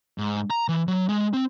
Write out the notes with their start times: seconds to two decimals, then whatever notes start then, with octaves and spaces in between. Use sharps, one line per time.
0.18 G#2
0.50 A#5
0.68 E3
0.88 F#3
1.09 G#3
1.33 C4